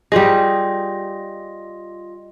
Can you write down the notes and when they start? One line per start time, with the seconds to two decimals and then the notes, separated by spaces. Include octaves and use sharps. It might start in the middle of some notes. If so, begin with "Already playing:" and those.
0.12 G3 F4 G#4 D#5